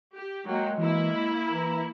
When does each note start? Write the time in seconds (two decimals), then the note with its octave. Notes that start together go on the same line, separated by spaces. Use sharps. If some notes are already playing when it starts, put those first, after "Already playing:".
0.15 G4
0.46 F#3 G#3 A#3 G5
0.78 E3 A#3 E4
1.15 B6
1.51 E3 A#5